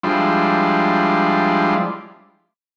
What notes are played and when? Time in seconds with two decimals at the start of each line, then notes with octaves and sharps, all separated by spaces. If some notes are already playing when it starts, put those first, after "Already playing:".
0.03 F3 G3 G#3 D4 E4 F4